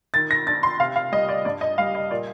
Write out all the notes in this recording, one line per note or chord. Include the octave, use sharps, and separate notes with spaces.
D#3 A6
A#6
D4 A6
C6
C3 F5
F5
G3 D#5
D5
G2 D5
D#5
G3 F5
D#5
A#2 D5